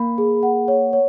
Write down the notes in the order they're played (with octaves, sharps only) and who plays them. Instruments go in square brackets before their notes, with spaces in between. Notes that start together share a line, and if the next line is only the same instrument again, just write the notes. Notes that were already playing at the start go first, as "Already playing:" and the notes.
Already playing: [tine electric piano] A#3 [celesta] B5
[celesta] G#4
F#5
C#5
C#5